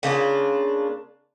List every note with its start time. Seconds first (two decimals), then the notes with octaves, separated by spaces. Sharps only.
0.03 C#3 A#3 D4 F4